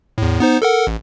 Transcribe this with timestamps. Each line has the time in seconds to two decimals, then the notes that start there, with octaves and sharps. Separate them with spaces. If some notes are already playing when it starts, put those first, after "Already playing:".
0.18 E2 A2
0.40 B3 D#4 C5
0.62 A4 A#4 F#5
0.87 A1